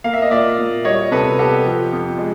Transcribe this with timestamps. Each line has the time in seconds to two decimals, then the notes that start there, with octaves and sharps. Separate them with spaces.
0.04 A#3 F5
0.13 E5
0.22 D#5
0.31 A#2 D5 E5
0.58 A#2
0.84 G3 C#5 D#5
1.11 C3 A4 B4
1.39 B3 G4 A4
1.66 F3
1.92 F2
2.18 G#3